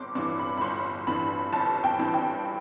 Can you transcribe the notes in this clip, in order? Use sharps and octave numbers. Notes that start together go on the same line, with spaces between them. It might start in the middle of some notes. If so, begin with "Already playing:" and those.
Already playing: G1 C6 D6
G2 E3 D6
B5
B5
G1 C6
G2 E3 B5
G1 A5
G5
G2 E3
G5